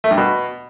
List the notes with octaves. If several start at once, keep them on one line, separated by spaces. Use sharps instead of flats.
A3
G2
B2